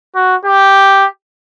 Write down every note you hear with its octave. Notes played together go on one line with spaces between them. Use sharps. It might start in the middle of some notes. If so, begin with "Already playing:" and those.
F#4
G4